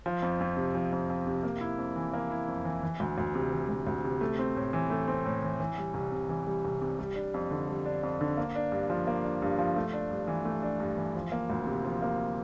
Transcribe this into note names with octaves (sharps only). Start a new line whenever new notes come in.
F3
F2
F2
C3
F3
F2
F2
C3
A#3
E4
F2
E3
A#3
E4
F2
E3
E3
D2
D2
C3
E3
D2
D2
C3
A3
C4
A2
E3
A3
C4
A2
E3
E3
G3
C2
C3
E3
G3
C2
C3
G3
D4
F2
D3
G3
D4
F2
D3
A#3
D4
G2
F3
A#3
D4
G2
F3
A3
D4
G2
E3
A3
D4
G2
E3
F3
A#3
D2
C3
F3
A#3